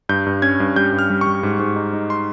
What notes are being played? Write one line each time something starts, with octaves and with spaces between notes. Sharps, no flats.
G2 G6
G2
C#4 G#6
G2
G3 G6
G2
F6
G3
G3 C#6
G#2
G#2
D#4
D#4
C6